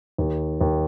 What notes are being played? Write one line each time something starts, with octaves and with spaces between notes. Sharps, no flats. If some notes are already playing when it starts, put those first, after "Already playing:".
D#2
D#2